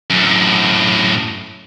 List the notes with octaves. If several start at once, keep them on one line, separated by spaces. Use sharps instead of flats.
F#2 A2